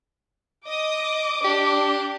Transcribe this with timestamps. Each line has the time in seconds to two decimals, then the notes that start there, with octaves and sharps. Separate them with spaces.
0.68 D#5 D6
1.44 D4 G4